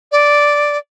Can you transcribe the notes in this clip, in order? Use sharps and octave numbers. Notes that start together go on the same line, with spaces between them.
D5